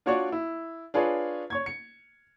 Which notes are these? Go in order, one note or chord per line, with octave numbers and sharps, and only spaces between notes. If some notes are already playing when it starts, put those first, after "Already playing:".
D4 F4 F#4 C#5 D5 C#6
E4
D4 F4 G#4 B4 C#5
C#5 C#6 G#6
C#7